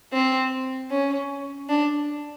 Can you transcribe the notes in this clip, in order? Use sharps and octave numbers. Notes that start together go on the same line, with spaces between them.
C4
C#4
D4